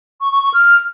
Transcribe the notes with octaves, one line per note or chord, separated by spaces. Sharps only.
C#6
C#6
C#6
F6